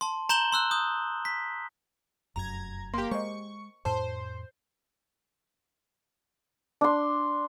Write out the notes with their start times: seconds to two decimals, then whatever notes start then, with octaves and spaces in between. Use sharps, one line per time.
0.01 A5 C6
0.29 A#5 C6 G6 E7 F#7 G7
0.52 C6 E6 F#6
0.71 D#6 G6
1.25 B6
2.36 F1 F#2 A#5 G#6
2.94 A#3 G4 C6
3.11 G#3 C5 D#5 C#6
3.85 F2 A2 C5 A5
6.81 D4 C6